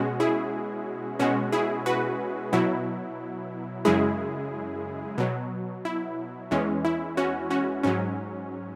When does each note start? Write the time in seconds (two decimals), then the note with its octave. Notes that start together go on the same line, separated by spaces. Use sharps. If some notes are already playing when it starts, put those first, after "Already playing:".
Already playing: B2 G#3 C#4 F#4
0.20 E4 G#4
1.19 B2 G#3 C#4 F#4
1.52 E4 G#4
1.86 F#4 B4
2.53 B2 F#3 E4
3.85 F#2 C#3 G#3 E4 G#4
5.18 B2 F#3
5.85 E4
6.51 E2 E3 G#3 C#4
6.85 E4
7.17 C#4 F#4
7.50 C#4 F#4
7.83 G#2 F#3 C#4